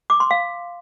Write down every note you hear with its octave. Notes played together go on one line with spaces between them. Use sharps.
D6
C6
F5